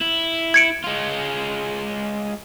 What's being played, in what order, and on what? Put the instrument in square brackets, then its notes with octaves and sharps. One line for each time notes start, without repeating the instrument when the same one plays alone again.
[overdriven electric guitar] E4
[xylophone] G#6 C#7 D7
[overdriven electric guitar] G#3 F4